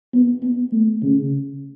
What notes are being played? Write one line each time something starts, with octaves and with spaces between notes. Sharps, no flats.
B3
B3
A3
C#3